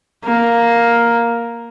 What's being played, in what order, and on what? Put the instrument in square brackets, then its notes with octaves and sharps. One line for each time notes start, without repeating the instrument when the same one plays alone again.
[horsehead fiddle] A#3